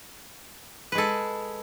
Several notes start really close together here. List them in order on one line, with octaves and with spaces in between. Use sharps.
B4 G#3 A4